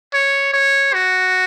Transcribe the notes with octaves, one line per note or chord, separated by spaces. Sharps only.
C#5
C#5
F#4